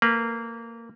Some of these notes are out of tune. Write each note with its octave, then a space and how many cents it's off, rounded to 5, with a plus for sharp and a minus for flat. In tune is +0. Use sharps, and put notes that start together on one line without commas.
A#3 -20 B4 -25